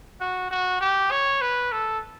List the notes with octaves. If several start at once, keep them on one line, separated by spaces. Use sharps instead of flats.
F#4
F#4
G4
C#5
B4
A4